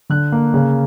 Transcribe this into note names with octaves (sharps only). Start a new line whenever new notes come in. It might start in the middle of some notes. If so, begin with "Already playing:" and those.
D3 F#6
A#3
C#3